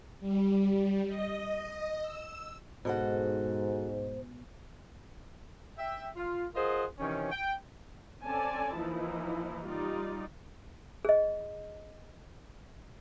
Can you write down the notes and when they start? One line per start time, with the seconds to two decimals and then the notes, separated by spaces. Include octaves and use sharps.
0.20 G3
1.08 D#5
2.01 E6
2.85 G#2 B2 F#4 A4 C5 D#5
5.78 E5 G5
6.16 F4
6.55 F4 G#4 A#4 C5 D#5 F#5
6.99 C3 D#3 E3 C#4
7.31 G5
8.25 C4 C#4 A4 D5 G#5 A5
8.78 E3 F3 A#3 D#4 E4
9.67 G3 D#4 F4 D5
11.05 G#4 D#5